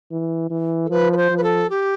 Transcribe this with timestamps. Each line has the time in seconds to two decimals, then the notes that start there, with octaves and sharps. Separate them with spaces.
0.11 E3
0.51 E3
0.85 A4
0.90 F3 B4
1.12 B4
1.17 C5
1.30 F3
1.37 B4
1.43 A4
1.70 G4